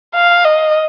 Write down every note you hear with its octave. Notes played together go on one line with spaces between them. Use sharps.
F5
D#5